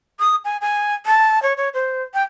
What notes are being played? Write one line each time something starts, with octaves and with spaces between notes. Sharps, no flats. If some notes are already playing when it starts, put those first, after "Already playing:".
D#6
G#5
G#5
A5
C#5
C#5
C5
G5